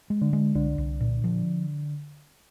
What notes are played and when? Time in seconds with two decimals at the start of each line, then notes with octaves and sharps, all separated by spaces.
0.10 G#3
0.22 D3
0.33 G#3
0.55 C2 D3
0.78 C2
1.00 A#2
1.24 F3